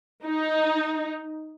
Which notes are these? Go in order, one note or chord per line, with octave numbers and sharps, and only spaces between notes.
D#4